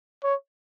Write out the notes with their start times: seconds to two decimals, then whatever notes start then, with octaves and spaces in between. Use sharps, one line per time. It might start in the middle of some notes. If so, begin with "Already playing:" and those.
0.24 C#5